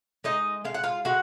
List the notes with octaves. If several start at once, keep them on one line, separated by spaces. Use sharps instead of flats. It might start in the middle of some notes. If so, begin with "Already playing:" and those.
G#3 D#4 D#5
G#3 F5
F#5
F4 F5
G#3 F#4 F#5